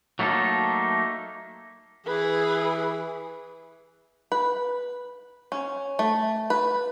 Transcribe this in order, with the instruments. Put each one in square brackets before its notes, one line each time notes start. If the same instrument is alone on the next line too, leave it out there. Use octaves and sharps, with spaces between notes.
[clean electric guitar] F#3 A3 A#3 D#4 A4
[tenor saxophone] E3 [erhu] G#4 [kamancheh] B4
[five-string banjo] B4
C#4
A3
B4